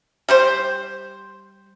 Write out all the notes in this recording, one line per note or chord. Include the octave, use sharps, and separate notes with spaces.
G3 G4 C5